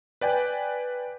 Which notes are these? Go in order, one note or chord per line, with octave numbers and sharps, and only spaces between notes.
B4 D5 G5 G#5